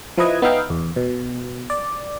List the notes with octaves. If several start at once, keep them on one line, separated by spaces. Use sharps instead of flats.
F3 E4 B4 D#5 G#6
B3 D#4 E5 F5 G5
E2
B2
D5